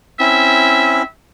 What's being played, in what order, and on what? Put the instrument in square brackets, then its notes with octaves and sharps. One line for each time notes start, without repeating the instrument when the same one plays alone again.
[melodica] C4 C#4 E4 [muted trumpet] E5